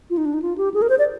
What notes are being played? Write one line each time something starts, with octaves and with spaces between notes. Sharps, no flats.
F4
D#4
D4
D#4
F4
G4
G#4
A#4
C5
D5